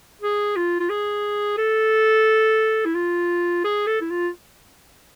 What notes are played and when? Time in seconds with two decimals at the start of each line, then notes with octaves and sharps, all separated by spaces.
0.22 G#4
0.57 F4
0.80 F4
0.90 G#4
1.58 A4
2.85 E4
2.95 F4
3.64 G#4
3.87 A4
4.01 E4
4.10 F4